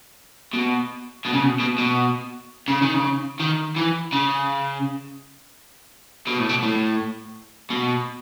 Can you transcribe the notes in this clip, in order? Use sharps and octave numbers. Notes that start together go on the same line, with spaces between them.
B2
B2
C#3
B2
B2
B2
C#3
D#3
C#3
D#3
E3
C#3
B2
A2
B2
A2
B2